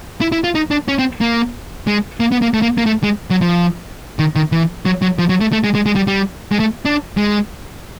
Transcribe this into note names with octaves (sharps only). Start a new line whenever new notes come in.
E4
E4
F4
D#4
D4
C#4
C4
A#3
G#3
A#3
B3
A#3
A3
A#3
A#3
A3
G#3
F#3
F3
D#3
D#3
E3
F#3
F#3
F3
F#3
A3
A3
G#3
G#3
G#3
G3
G3
G#3
A3
D4
G#3